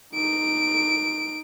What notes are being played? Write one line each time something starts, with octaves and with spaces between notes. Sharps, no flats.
D#4 D7